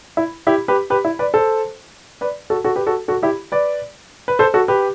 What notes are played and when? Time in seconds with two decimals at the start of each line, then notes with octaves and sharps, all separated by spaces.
0.17 E4
0.47 E4 G4
0.68 G4 B4
0.90 G4 B4
1.05 E4
1.19 B4 D5
1.34 A4 C5
2.21 B4 D5
2.50 F#4 A4
2.64 F#4 A4
2.76 G4 B4
2.87 F#4 A4
3.08 F#4 A4
3.23 E4 G4
3.52 B4 D5
4.28 B4
4.39 A4 C5
4.54 F#4 A4
4.68 G4 B4